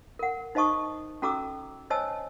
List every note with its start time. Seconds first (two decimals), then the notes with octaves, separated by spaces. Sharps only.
0.19 A#4 F#5
0.55 D#4 C5 D#5 A5 C#6 D#6
1.22 C#4 F#4 A4 A#5 D6 E6
1.90 C5 C#5 D#5 G#5 A5 E6